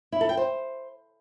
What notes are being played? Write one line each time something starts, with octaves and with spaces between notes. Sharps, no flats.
E4
A4
G5
C5